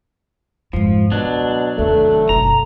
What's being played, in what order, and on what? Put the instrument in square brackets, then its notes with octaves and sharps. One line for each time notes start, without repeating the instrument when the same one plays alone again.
[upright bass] F2 G#2 [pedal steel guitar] F3
[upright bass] C#2 [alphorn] B2 [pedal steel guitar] F#3 D4
[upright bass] F1 D#2 [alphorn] A3
[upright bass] F#1 B1 [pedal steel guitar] A#5